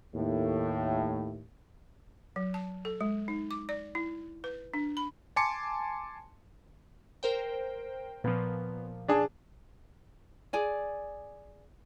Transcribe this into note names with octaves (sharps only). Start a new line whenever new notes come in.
D#2 A2
F#3
A5
A4
G#3
D#4
D6
D5
E4
B4
D4
B5
G#5 A5 C6 D6 C#7
A#4 C5 G5
A#2 F3 B3
D4 G#4 A5
G#4 D5 G#5